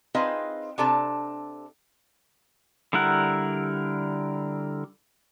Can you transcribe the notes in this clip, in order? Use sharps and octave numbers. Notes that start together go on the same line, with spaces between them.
C4 D#4 F4 G#4 B4 D#5
C3 D4 A4 A5
D3 G3 E4 A#4 F#5